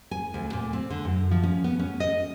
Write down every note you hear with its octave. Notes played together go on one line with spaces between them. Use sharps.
G#5
D2
A#2
C4
D3
F#2
F3
C#4
B3
C#4
D#5